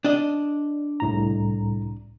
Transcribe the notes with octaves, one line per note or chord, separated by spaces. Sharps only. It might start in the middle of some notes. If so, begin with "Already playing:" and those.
D4 D#5
C2 A2 A#5